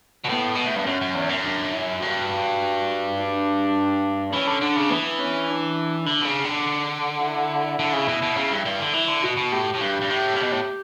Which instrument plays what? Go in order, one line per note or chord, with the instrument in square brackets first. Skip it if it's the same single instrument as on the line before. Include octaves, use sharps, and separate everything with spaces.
[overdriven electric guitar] B2
[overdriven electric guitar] A2 [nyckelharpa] B3
[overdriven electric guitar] B2
A2
G2
[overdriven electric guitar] F#2 [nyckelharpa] C#4
[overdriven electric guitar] F#2
E2
F#2
[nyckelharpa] D4
E4
[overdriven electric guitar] G2 [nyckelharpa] F#4
[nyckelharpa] D4
[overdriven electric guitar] E3 [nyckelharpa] C#4
[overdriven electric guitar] D3
[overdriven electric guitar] D3 [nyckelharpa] D4
[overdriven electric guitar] C#3
[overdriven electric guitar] E3 [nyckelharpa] B3
[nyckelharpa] C#4
D4
[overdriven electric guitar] D3 [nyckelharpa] D4
[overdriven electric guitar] B2
C#3
D3
[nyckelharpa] E4
[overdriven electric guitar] D3
C#3
B2
B2
C#3
G2
G2
D3
[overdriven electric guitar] E3 [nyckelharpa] E4
[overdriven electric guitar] D3
[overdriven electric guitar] B2 [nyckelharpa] F#4
[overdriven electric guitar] B2
[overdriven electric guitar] A2 [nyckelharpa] G4
[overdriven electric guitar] A2
G2
G2
A2
C#3
B2
A2